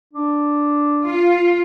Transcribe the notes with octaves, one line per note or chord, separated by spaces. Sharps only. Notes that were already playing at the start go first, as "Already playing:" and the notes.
D4
F4